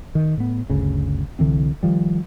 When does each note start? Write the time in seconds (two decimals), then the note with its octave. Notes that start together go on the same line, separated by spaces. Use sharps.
0.15 D#3
0.37 A2 B3
0.70 G1 D2 C#3
1.39 C2 D3 E3 C4
1.83 D#3 F3 G3